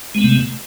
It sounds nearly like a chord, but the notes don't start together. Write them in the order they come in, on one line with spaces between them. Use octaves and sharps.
G#3 B3 A3 C3